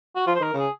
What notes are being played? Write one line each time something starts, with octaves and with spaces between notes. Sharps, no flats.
F#4
F3 F4
C5
D#3 A#4
C#3
G#4